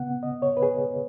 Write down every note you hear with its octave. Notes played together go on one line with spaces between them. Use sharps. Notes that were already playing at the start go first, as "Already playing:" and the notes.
Already playing: C#3 B3 F#5
D#5
C#5
B4
G#4